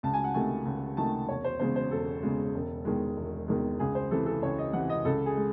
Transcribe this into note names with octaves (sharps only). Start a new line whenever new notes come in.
C#2 A5
G#5
F#5
C3 D#3 A3 G#5
C#2
C3 D#3 A3 A5
E1 C#5
C5
E2 C#3 G#3 C5
C5
E1 A4
E2 C#3 G#3
E1
E2 D#3 G#3
E1
E2 D#3 G#3
C#2 G#4
C5
C3 E3 A4
A4
C#2 C#5
D#5
C3 E3 F#5
D#5
C#2 A4
G#4
G#3